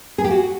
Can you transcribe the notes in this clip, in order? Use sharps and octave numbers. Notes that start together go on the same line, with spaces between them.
G#4
G4
F#4